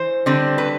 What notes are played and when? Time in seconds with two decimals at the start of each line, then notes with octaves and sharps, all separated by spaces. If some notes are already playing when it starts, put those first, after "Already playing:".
Already playing: E3 C5
0.26 D3 G3 C4
0.58 B4